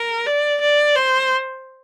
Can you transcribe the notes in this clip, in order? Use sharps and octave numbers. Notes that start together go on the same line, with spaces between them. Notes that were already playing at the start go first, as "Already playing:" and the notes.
Already playing: A#4
D5
D5
C5